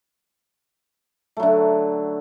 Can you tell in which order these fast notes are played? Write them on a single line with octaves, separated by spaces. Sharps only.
A3 F#3 D3